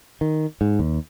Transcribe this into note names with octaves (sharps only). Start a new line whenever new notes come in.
D#3
G#2
D#2